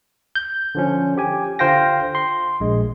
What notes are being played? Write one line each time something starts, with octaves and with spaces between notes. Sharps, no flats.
G6
D3 F3 C#4
G4 G#5
D3 F4 C5 F5 G5 A#6
C6
A#1 G#3